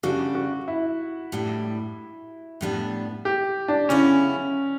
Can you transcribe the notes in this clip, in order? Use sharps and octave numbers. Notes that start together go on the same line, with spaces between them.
C#3 G3 D4 F#4
F#4
E4
A2 G3 D4
A2 G3 B3 D4
G4
D4
C#3 F#3 B3 C#4 E4